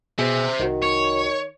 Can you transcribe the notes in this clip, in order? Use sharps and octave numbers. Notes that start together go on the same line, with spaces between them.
B2 G#4 C5 E5
C2 D#3 F#4
C#5